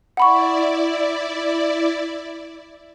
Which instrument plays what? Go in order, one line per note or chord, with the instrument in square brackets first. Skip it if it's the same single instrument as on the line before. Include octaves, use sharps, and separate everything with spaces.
[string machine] E4 D5 [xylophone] F#5 B5 C#6